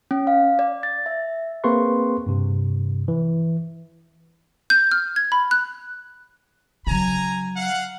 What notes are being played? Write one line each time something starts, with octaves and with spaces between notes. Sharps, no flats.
C#4
F5
D5
A6
E5
A#3 C4 G#4 B4 C6 C#6
G2 C3
E3
G6
F6
G#6
B5
F#6
C#3 F#3 G#5 A#5
F5 F#5